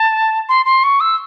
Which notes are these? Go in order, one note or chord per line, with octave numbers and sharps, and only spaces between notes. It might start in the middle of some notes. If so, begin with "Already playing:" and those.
Already playing: A5
C6
C6
C#6
E6